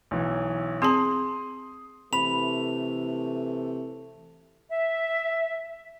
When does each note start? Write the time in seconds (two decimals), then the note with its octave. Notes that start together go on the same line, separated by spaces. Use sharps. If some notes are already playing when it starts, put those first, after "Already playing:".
0.11 B1 E3
0.82 C4 G#4 A5 C6 D#6
2.13 C3 E3 A3 B5 F7
4.71 E5